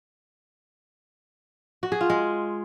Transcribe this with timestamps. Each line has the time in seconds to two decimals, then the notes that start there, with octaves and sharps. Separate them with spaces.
1.83 F#4
1.92 G#4
2.01 F4
2.10 G#3